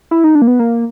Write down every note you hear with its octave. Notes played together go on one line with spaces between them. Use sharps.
E4
D#4
D4
A#3
B3
A#3